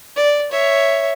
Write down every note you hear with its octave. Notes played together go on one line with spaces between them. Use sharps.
D5
C#5 E5